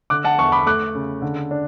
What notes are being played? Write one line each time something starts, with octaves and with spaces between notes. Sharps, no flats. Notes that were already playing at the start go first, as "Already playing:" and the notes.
D3 D6 F#6
F#5 A5
E2 A5 C#6
B5 D6
A3 D6 F#6
C#3
D3
D4